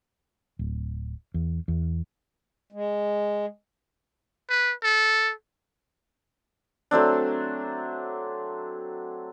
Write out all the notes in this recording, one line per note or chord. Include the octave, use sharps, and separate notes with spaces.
D1
E2
E2
G#3
B4
A4
F#3 A3 C4 D4